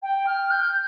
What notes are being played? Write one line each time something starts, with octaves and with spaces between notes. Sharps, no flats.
G5
F6
G6